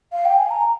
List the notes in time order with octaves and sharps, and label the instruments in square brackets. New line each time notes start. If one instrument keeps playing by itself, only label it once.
[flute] F5
G5
G#5
A#5